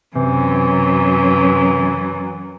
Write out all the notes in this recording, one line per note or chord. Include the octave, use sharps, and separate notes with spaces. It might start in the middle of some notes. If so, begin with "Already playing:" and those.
F#2 C3 E3